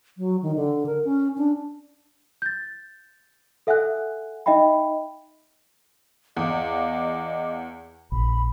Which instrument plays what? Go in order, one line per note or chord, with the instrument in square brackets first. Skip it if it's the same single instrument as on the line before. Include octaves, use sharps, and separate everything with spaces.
[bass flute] F#3
D#3
D3
A#4
C#4
D4
[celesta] G6 A6
A4 E5 F#5 G#5 F#6
D#4 D#5 E5 G5 B5
[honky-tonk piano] E2 [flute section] D#5 F5 D6
[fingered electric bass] A#1 [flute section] B5